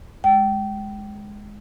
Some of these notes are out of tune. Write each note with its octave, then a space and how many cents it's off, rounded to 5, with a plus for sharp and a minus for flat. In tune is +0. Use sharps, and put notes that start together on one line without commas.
G#3 +0 G5 -25